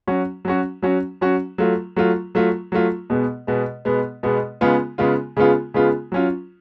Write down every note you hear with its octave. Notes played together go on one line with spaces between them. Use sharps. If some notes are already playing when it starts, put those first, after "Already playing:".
F#3 C#4 F#4
F#3 C#4 F#4
F#3 C#4 F#4
F#3 C#4 F#4
F#3 A3 F4
F#3 A3 F4
F#3 A3 F4
F#3 A3 F4
B2 G#3 B3
B2 G#3 B3
B2 G#3 B3
B2 G#3 B3
C#3 G#3 B3 F4
C#3 G#3 B3 F4
C#3 G#3 B3 F4
C#3 G#3 B3 F4
F#3 C#4 F4